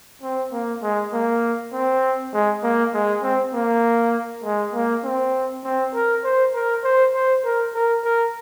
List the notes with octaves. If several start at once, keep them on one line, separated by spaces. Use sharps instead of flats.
C4
A#3
G#3
A#3
C4
G#3
A#3
G#3
C4
A#3
G#3
A#3
C4
C4
A#4
C5
A#4
C5
C5
A#4
A#4
A#4